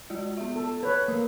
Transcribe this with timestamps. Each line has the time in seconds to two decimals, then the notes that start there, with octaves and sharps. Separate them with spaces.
0.10 G#3 F4 F#4
0.37 B3 F4 E5
0.56 A4
0.83 A4 B4 C#5
1.08 A#3 D#6 E6